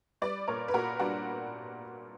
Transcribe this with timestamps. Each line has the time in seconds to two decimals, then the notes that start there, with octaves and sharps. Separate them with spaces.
0.22 G3 B4 D5
0.48 A#2 A#4 C#5
0.68 B4
0.74 A#2 F#4 A#4
0.99 G3 D4 F#4